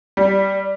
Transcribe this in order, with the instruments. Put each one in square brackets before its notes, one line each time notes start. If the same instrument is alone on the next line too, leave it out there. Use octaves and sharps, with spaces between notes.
[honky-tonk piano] G3